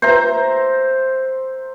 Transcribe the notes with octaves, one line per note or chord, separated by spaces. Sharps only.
C5 E5 A#5